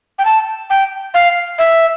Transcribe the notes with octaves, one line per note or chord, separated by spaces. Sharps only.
G5
A5
G5
F5
E5